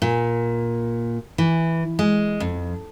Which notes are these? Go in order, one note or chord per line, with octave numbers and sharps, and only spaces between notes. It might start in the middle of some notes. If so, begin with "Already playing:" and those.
A#2
E3
G#3
F2